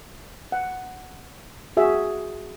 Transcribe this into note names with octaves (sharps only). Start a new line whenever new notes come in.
F#5
F#4 G#4 E5